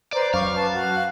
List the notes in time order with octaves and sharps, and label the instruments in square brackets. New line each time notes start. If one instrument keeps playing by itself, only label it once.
[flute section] B4 C5 A#5 [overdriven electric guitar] D5
[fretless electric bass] F#2 [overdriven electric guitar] F5 [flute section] C#6 D6
[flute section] B4 A5
F#4